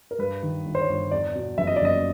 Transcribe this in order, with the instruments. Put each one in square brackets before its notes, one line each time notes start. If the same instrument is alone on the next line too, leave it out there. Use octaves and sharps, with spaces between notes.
[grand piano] A#4
G2 B4
D#3
G1
C5
C#5
G1
E2 D5
B2
F#1 E5
D#5
D5
F#1 D#5